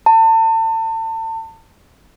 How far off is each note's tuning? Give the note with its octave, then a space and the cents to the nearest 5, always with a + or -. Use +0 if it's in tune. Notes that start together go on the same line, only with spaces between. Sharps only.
A5 +35